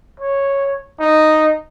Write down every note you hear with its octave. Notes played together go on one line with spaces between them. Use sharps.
C#5
D#4